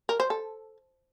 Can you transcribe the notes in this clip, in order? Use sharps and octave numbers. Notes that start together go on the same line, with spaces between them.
A#4
C5
A4